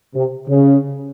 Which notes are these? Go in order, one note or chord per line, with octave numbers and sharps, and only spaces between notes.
C3
C#3